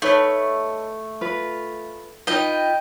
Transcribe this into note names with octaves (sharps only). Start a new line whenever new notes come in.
A3 D#4 B4 C#5
F4 B4
D#4 F4 B4 D#5 G5